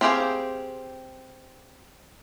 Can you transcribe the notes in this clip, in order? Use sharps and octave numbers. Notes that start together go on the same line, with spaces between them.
C4 G4 G#4 C5 F5